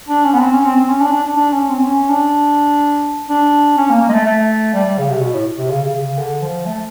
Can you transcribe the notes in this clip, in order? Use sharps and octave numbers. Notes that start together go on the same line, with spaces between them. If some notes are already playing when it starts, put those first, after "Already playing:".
D4
C#4
B3
C4
C#4
C4
C4
C#4
D4
D4
D4
D4
C#4
C4
C4
C#4
D4
D4
C#4
A#3
A#3
G#3
A3
A3
G3
G3
C#3
C3
B2
A2
C3
C#3
C#3
C#3
C#3
D3
F3
A3